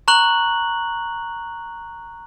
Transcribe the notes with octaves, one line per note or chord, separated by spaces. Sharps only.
A#5 C#6 F#6 F#7